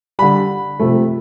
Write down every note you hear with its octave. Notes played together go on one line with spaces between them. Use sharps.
D3 G3 B5
C3 F3 A3